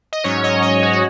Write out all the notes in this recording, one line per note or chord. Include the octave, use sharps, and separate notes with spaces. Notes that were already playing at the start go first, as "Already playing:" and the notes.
D#5
G#2 F#3 C#4 C#5
D#5
C#5
F#4
F#4